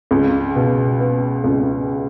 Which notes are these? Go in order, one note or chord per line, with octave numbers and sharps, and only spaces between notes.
C#2
B2
B3
C#2